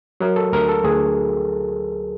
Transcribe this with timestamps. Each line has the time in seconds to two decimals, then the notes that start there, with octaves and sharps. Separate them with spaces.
0.20 F#3 A#4
0.36 A4
0.53 D2 A#4
0.69 A4
0.84 D2 G#4